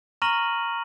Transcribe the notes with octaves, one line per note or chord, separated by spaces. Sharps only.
A#5 C#6 F6 A#6 D#7 F#7